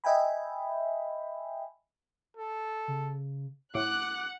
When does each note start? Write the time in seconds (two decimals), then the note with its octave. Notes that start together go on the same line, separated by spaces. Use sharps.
0.04 D#5 E5 G5 G#5 B5
2.37 A4
2.88 C#3
3.75 A2 F#5 D6 F#6